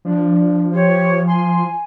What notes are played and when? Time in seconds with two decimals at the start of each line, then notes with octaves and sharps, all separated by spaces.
0.05 F3 D4
0.72 G4 C5 C#5
1.27 G#5 C6